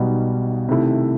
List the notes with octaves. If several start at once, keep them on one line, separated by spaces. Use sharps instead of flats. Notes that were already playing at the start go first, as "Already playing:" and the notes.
Already playing: B1 B2 G3 B3 D#4
C3 D#3 A3 E4